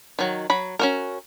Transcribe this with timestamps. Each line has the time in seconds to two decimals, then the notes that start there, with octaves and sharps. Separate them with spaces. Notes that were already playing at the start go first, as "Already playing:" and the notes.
0.19 D#3 F#3
0.50 F#3 B5
0.79 C#4 F#4 A#4